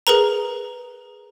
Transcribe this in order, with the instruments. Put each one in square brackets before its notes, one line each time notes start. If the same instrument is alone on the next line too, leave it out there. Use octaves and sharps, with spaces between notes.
[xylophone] G#4 A#4 B4 A#5